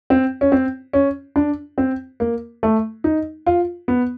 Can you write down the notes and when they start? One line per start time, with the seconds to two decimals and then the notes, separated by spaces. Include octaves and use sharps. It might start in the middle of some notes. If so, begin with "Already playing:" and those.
0.10 C4
0.41 C#4
0.52 C4
0.93 C#4
1.36 D4
1.78 C4
2.20 A#3
2.63 A3
3.04 D#4
3.46 F4
3.88 B3